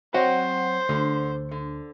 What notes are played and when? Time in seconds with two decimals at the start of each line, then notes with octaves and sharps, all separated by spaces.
0.14 F#3 C4 F#4 C5 D#5 F#5 G5
0.89 D2 D3
1.51 D3